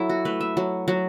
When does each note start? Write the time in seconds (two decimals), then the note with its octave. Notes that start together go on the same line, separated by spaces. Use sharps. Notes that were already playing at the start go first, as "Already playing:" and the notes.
Already playing: F#3 E4 A4
0.09 F#4
0.25 A3 B4
0.41 E5
0.57 F#3
0.88 F#3